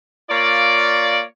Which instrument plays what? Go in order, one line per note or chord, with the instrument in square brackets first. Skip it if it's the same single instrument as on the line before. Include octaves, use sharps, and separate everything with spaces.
[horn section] A#3 F4 C#5 D5